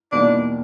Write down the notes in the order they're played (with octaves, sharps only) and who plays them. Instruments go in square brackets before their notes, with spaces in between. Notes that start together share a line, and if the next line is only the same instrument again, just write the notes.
[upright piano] E2 B2 G3 A#3 D#4 [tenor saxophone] D4